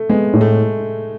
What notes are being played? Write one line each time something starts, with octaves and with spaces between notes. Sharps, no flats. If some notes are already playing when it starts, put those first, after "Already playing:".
Already playing: A3
G#3 B3
A2
A3